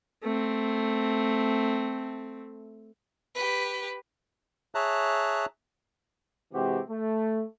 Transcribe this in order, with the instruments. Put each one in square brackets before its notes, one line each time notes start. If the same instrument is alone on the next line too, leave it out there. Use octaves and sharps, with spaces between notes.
[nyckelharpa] A3 C4
[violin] G4 B4
[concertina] G#4 C#5 E5 A5 A#5 F#6
[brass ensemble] C3 E3 G#3 C4 F#4 G4
A3